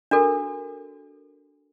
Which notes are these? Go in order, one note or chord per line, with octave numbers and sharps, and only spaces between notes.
D4 F#4 A4 A#4